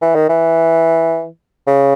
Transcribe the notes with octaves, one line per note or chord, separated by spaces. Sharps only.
E3
D#3
E3
C#3